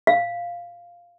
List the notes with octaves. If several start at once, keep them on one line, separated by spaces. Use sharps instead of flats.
F5